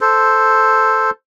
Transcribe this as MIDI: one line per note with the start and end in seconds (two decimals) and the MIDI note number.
0.01 1.10 69
0.01 1.10 72